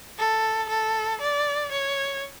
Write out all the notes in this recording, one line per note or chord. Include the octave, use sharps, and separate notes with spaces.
A4
A4
D5
C#5